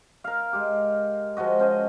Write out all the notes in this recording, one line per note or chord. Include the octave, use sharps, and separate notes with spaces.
A#4 F5
G#3 G4
F3 G#3 F#4 D#5
C#4 C5 D#5